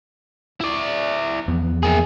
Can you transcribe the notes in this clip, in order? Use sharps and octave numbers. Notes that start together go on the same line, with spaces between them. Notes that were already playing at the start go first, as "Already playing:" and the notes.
E4 D5
E2 F3 B3
A#3 G#4